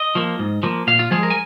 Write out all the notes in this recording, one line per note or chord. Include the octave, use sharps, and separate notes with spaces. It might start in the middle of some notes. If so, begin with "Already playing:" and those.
Already playing: D#5
F3 A#3
G#2
F3 A#3
A#2 F5
F4
F3 G#3 G#4
A#4
G#5